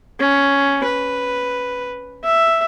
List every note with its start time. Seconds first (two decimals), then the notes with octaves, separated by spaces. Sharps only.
0.20 C#4
0.84 B4
2.24 E5